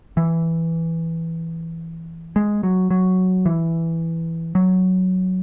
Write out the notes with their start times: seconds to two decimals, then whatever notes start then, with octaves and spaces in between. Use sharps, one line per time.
0.17 E3
2.36 G#3
2.63 F#3
2.91 F#3
3.46 E3
4.55 F#3